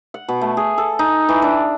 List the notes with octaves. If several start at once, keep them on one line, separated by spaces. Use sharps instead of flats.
F#5
B2
A3
G#4
A4
D#4
E3
D4